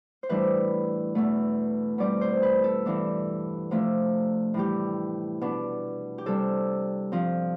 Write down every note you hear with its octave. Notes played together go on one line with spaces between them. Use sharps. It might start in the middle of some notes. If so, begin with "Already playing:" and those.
C5
A2 E3 G3 D4 B4
E2 B2 A3
B2 G3 C4 D5
C5
B4
A4
G2 E3 B3 D4
C3 F3 A3 D4
A2 E3 G3 G4
B2 B3 D4
G4
C3 G3 D4 A4
G2 F3 C4